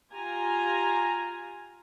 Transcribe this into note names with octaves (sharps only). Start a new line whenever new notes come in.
F4 G4 G#5 A#5